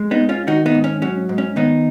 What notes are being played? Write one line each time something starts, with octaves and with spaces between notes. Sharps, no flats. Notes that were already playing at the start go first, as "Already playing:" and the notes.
Already playing: G#3
B3 D#4
G#2
C#4 F4
D#3 D#4 F#4
B3 D#4
G#2
C#4
F#3 C#4
G#2
C#4
D#3 B3 D#4